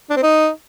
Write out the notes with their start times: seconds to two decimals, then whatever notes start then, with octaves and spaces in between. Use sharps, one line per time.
0.10 D4
0.16 C4
0.23 D#4